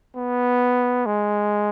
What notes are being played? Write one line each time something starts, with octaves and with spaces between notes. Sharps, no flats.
B3
G#3